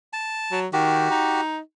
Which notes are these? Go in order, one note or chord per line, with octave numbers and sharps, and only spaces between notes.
A5
F#3
D#3 F#4 G4
D#4